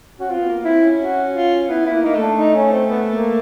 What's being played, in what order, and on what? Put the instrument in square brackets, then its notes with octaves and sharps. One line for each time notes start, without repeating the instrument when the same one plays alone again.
[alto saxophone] C#4 [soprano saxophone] F#4
[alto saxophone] C4 [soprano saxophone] F4
[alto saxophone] B3
A#3
[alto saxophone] C4 [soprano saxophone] E4
[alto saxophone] C#4
[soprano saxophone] F#4
F4
[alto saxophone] B3 [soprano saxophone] E4
[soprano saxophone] E4
[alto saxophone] A#3
[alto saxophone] A#3 [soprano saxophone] D#4
[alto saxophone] A3
[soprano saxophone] D4
D#4
C#4
C4
B3
A#3